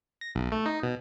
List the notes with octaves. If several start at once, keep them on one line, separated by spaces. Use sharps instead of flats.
A#6
B1
A3
D#4
B2